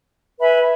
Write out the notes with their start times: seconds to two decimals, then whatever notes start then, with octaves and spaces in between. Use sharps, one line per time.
0.40 B4 E5 G#5 B5